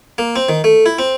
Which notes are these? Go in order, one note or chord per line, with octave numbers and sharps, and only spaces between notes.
A#3
C4
D#3
A3
E4
C4